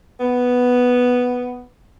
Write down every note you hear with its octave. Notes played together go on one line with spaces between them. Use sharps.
B3